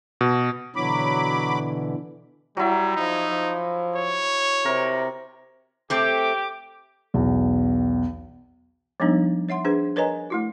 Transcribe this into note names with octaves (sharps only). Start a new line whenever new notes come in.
B2
B2 D3 E3 F#3 B5 D6
F#3 G3 E4
F3 D#4
F3
C#5
C3 A#4
A3 C4 G4 A4 D6
B1 E2
F3 G3 G#3 B3 D4 D#4
C#5 E5 F#5 C6
D4 G#4 B4 C5
A#4 B4 C#5 D#5 G#5 A#5
A3 E4 F#4